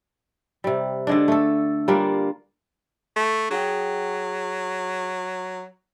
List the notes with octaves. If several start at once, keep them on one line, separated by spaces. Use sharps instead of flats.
C3 G3
D3 G#3 D4
A3 A4
G3 A#3 D4 F4
A3
F#3 G#4 F#5 G5